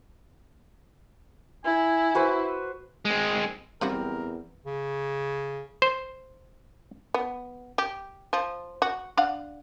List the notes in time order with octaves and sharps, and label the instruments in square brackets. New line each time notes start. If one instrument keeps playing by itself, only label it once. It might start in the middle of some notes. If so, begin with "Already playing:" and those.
[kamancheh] E4 [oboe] G#5
[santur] F#4 B4 C5
[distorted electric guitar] G#3 C4
[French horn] E2 [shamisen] F#3 F4 F#4 [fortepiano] G3 C4 [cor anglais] A#4
[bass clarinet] C#3
[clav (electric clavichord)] C5
[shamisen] B3
G4
F3
F#4
D4 F5 F#5